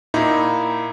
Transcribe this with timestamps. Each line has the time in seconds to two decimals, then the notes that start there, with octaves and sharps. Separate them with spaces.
0.14 A#2 D#4 E4